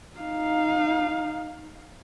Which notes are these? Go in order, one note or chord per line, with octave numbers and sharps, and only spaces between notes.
D#4 F5